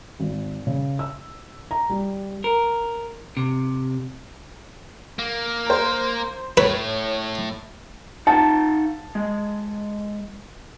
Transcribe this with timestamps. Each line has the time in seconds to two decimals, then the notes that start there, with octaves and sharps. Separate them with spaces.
0.20 G#1
0.67 C#3
0.99 E6
1.71 A#5
1.90 G3
2.44 A#4
3.37 C3
5.19 A#3
5.67 C5 A#5
6.57 A2 B4 C#5
8.27 D#4 F5 F#5 A5
9.15 G#3